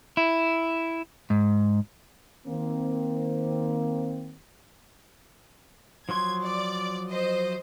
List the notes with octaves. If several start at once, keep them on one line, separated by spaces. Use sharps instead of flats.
E4
G#2
D#3 A#3 C4
F3 F#3 C6 G#6
D5
C5 D#5